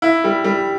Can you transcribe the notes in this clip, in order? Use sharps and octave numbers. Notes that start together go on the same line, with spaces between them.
E4
G3
G3